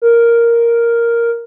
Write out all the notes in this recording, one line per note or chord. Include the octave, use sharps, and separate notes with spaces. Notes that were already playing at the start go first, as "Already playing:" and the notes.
A#4